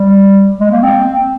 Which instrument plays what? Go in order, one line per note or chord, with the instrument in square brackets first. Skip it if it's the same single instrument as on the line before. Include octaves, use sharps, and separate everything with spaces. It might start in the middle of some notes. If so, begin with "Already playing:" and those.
Already playing: [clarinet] G3
G#3
A#3
C4